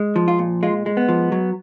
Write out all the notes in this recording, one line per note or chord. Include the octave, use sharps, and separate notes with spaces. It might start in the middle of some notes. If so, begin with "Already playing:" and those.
Already playing: G#3
F3
F4
A#2
G#3 F4
G#3
B3
F3
F#3